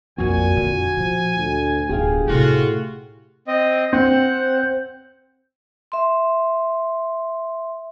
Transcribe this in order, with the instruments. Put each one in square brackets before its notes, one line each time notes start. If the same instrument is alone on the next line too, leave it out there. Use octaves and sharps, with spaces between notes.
[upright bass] A#1 F2 [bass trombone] A#2 [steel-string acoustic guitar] F#4 [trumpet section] G#5
[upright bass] F2 D3
[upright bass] A#2 [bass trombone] F3
[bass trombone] D2
[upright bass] D1 [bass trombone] G1 [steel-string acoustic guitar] G4 G#4 F5
[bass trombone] A2 [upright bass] C3 A3 [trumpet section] F4 F#4
[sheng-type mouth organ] C4 D#5
[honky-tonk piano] C4 [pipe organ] C5 [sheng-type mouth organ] F#5
[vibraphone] E5 C6